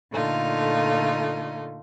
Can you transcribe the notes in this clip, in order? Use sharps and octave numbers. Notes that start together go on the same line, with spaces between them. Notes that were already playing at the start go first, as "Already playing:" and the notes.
A#2 D3 A3 D#4 F4